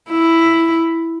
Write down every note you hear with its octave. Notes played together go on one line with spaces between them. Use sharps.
E4